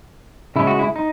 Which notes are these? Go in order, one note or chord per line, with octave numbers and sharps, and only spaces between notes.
C#3 G#3 C#4 E4
F#4
E4
D#4